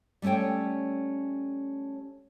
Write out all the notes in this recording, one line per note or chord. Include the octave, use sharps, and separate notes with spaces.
G3 A3 C#4 C#5 G5